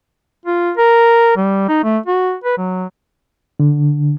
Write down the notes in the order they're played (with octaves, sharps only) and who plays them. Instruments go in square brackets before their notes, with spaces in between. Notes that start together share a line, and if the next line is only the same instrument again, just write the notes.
[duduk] F4
A#4
G3
D#4
A3
F#4
B4
F#3
[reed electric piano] D3